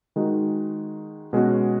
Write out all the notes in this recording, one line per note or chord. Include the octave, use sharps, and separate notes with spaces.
D#3 G#3 D#4 F#4
B2 G#3 C#4 F#4